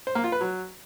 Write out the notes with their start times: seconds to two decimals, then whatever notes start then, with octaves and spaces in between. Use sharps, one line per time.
0.07 C5
0.15 A#3
0.24 F4
0.32 B4
0.41 F#3